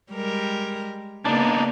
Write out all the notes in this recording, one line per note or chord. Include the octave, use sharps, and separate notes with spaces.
G3 G#3 A#4
C#3 A#3 B3 D4 D#4